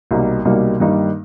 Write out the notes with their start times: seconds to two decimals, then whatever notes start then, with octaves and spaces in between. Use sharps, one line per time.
0.11 C2 B2 G3 A#3 D#4
0.45 C2 B2 G3 A#3 D#4
0.80 G2 D#3 G3 A#3 D#4